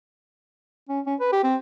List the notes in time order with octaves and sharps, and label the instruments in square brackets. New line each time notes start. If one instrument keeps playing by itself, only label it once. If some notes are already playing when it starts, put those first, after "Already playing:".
[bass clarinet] C#4
C#4
B4
G4
C4